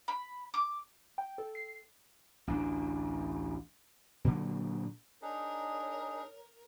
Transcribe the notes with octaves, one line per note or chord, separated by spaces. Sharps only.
B5
D6
G5
A4
C7
A1 D2 D4
A#2 D3 F#3
D4 D#4 G#4 A#4 C#5